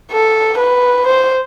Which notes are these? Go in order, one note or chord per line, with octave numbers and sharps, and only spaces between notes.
A4
B4
C5